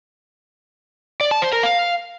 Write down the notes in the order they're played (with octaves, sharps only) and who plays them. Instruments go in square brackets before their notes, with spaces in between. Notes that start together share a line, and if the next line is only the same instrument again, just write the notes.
[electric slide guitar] D5
A5
C5
A#4
F5